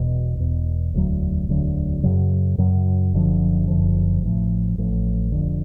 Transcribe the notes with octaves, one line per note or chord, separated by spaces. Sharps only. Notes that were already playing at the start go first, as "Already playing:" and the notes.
Already playing: E1 E2 B2
E1 E2 B2
E1 D2 D3 F#3
E1 D2 D3 F#3
F#2 C#3 F#3
F#2 C#3 F#3
F#1 F#2 D3 F3
F#1 F#2 D3 F3
A1 A2 F3
A1 A2 F3
F1 F2 D3